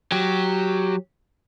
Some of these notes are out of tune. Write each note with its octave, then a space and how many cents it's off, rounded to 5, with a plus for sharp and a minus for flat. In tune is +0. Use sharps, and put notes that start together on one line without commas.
F#3 +0 G4 +0